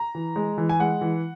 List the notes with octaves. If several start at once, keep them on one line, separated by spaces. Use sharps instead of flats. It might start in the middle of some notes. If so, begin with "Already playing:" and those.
Already playing: A#5
E3
G#3
E3
G#5
G#3 F#5
E3